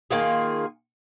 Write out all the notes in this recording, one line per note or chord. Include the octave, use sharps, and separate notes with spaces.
D#3 A#3 F4 G#4